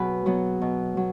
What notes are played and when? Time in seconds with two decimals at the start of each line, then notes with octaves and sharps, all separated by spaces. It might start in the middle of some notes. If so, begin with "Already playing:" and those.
Already playing: B2 F#3 F#4 G#4 B4
0.26 F#3 B3
0.62 B2
0.97 F#3